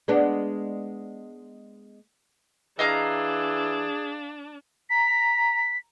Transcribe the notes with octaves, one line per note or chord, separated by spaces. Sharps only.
G#3 B3 D4
E3 D4 G#4 D#5 F5 A#5
A#5 B6